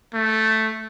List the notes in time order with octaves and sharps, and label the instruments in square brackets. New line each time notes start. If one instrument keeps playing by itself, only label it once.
[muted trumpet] A3